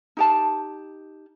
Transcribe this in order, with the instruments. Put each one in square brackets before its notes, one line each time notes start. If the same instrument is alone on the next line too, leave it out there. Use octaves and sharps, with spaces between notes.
[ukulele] D#4 G4 A5